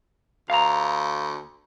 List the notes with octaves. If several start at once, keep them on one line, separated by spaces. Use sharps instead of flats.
D2 F5 A#5